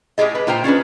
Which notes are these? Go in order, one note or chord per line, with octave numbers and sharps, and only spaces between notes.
A2 C4 G4 G#4 D#5
B4
A#2 F4 C5 G5 A#5
C#4 D4 G#4 B4